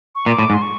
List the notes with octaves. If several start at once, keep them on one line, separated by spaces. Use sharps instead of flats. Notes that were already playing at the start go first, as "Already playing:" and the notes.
C#6
A#2 D6
A2
G#2
C6
C#6